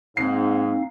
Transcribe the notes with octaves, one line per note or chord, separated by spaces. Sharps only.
G#2 A#3 C4 D#4 F5 C7